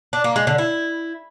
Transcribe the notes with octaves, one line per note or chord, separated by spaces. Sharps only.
D4
A#3
G#3
D3
E4